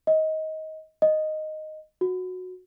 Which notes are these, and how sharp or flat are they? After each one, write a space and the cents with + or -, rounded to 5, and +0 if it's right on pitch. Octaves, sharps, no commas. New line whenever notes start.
D#5 +20
D#5 -5
F#4 -10